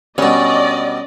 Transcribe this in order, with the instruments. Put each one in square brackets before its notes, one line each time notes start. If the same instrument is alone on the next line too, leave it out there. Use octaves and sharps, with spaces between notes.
[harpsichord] G2 B2 [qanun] C#4 [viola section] D5 D#5